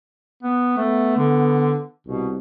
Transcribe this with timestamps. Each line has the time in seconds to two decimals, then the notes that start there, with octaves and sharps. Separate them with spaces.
0.43 B3
0.77 A3 B3
1.17 D3
2.07 C2 B2